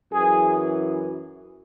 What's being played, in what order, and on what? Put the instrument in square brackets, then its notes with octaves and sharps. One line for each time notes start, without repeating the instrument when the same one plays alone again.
[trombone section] F#2 E3 G#4